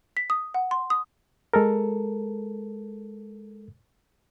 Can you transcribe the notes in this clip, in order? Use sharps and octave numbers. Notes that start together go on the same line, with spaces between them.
B6
D#6
F#5
C6
D#6
G#3 A4 A#4